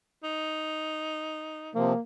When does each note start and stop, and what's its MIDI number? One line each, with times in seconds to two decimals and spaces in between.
0.23 1.72 63
1.75 1.93 48
1.75 1.93 53
1.75 2.00 58